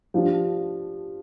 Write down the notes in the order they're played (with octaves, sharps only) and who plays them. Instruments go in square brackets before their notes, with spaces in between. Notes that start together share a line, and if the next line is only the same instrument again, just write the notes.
[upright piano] F3 D4 G4